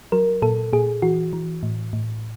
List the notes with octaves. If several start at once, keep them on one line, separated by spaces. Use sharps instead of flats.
F#3 A#4
A#2 A4
A#2 G#4
E3 F#4
E3
A2
A2